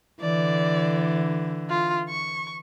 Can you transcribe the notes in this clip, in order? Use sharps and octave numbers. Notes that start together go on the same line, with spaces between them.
D3 E3 D5
F4
C#6